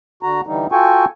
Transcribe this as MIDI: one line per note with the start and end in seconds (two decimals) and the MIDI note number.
0.23 0.41 50
0.23 0.41 66
0.23 0.41 82
0.47 0.67 50
0.47 0.67 52
0.47 0.67 55
0.47 0.67 63
0.72 1.05 65
0.72 1.05 66
0.72 1.05 69
0.72 1.05 79
0.72 1.05 80
0.72 1.05 85